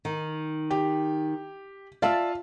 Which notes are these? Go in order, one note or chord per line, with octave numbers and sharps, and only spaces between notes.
D#3
G4
F4 D5 E5 F5 A5